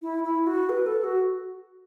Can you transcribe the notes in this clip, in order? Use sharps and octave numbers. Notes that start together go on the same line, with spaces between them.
E4
E4
F#4
B4
A4
F#4